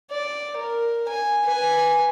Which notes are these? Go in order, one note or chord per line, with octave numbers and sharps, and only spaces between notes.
D5
A#4
G#5
B4 G#5